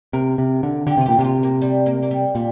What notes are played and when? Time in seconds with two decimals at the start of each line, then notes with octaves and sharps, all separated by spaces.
0.13 C3 A#4
0.38 C3
0.63 D3
0.87 D3 G4
0.98 C3 F4
1.06 A#2 G4
1.19 C3 G4
1.24 F4
1.43 A#3
1.62 G3
1.86 A#3
2.02 A#3
2.11 G3
2.35 A#2 G3